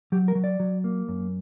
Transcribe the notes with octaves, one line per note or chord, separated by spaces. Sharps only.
F#3 G4
A#4
F#3
D5
F#3
A#3
F#2